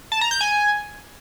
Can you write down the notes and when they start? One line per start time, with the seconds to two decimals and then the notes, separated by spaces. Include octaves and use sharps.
0.12 A5
0.21 A#5
0.31 G6
0.41 G#5